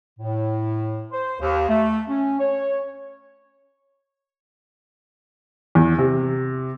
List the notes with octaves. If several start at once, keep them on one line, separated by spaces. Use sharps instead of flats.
A2
C5
D#2
A3
C#4
C#5
E2
C3